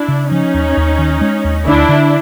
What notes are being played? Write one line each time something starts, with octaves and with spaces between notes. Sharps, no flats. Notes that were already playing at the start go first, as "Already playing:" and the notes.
Already playing: D4 E4
C#3
F3 C#4 D#4
D#2
D#2
D#3
G#3
D#2
D2 D4 E4
D3